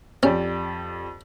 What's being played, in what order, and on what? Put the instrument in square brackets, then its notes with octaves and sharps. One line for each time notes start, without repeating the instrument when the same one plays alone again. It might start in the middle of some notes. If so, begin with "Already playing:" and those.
[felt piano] F2 G4 D5 [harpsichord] C#4